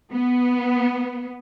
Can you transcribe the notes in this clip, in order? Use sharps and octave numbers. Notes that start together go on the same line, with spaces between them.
B3